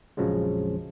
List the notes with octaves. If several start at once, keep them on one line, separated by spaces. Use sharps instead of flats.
A#1 F2 C#3 F3 F#3 G#3